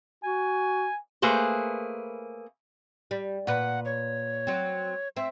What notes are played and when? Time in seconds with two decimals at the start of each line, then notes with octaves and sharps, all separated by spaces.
0.24 F#4 G#5
1.22 A3 A#3 G#4 B4 C5
3.11 G3
3.47 A#2 B4 F#5
3.85 C#5
4.47 F#3 C4
5.17 C4 E5